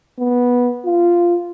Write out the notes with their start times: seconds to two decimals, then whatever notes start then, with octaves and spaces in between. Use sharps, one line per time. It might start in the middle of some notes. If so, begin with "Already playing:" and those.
0.19 B3
0.85 F4